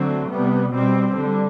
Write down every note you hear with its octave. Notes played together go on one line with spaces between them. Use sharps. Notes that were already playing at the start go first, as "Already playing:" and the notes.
Already playing: D3 F#3 A3 C4
C3 G3 B3
B2 G3 C4
D3 G3